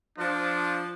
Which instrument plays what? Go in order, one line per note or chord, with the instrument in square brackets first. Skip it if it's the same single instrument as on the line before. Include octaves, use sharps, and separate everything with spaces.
[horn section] F3 [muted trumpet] D4